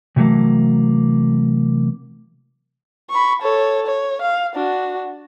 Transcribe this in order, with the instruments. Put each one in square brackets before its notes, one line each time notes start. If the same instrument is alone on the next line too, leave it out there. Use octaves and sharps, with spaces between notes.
[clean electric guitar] C3 E3 F#3 A3 A#3
[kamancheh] B5 C#6
A4 C#5
C#5
F5
D4 F#4